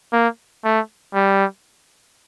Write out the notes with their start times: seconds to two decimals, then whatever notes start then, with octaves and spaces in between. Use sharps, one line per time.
0.13 A#3
0.65 A3
1.15 G3